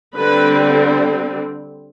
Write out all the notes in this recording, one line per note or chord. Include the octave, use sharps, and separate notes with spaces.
D3 G3 C4 B4